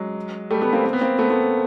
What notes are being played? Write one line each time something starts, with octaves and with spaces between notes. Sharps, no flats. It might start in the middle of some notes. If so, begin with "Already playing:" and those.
Already playing: F#3 G#3
G3 A3
A3 B3
A#3 C4
A#3 C4
B3
A#3 C4
A3 B3
A3 B3